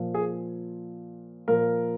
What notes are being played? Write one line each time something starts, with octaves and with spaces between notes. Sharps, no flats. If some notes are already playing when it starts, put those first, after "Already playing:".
Already playing: A#2 F3
G#4
A#2 F3 A#4